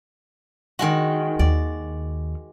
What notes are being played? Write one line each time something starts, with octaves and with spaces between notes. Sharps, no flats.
D#3 G#3 F#4
D#2 D5